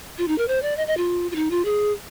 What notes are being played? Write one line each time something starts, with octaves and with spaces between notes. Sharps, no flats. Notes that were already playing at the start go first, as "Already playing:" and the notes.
F4
D#4
A#4
C5
D5
D#5
D#5
F4
F4
D#4
F4
G#4